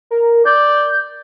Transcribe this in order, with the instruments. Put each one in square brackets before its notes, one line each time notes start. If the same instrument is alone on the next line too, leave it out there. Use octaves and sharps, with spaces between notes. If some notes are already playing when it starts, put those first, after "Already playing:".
[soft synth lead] A#4
[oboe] D5 [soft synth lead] G6